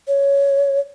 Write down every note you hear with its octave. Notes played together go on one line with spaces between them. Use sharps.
C#5